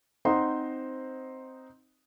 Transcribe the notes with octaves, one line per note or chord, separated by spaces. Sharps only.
C4 D#4 C5 D#5 F#5 C6